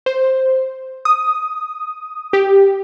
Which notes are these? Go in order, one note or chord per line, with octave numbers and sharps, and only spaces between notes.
C5
D#6
G4